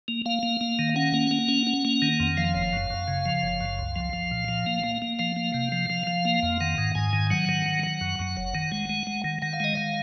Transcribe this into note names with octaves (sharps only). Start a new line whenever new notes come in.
A#3
A#3 F5
A#3
A#3
D#3
C#4 F#5
A#3
A#3
C#4
C#4
A#3
D#3
F2
F3 F5
F#1
F#2
F#2
C#3
F3
F#1
F#2
C2
F3
F3
A#2
F3
A#3
A#3
A#3
F3 F5
A#3
C3
F3
F3
F3
A#3
F2
D#3 F#5
G#2
G#2 G#5
D#3
F#3 F#5
D#3
F#3
F#3
F#2
F#2
F#1
D#3
G#3
G#3
G#3
D#3
D#3 F#5
F5
G#3 D#5
D#3 F5